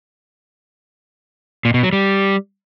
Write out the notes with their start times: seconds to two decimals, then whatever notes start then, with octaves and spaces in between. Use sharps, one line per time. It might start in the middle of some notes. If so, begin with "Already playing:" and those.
1.65 A#2
1.74 B2
1.83 F#3
1.93 G3